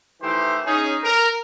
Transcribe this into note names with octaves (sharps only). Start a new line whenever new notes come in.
D#3 E3 A3 E4 G4 C5
C#4 D#4 G#4
A#4